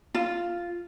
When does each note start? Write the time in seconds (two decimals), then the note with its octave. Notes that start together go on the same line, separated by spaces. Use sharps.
0.14 F4